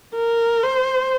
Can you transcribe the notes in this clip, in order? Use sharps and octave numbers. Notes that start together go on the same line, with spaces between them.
A#4
C5